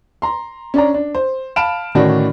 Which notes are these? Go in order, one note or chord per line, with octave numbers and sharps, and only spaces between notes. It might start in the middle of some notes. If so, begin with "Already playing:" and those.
A#5 C6
C#4 D4 D5 A#5
D4
C5
F5 A5 B5 F6 D7 E7
A2 D3 D#3 C#4 D4 F#4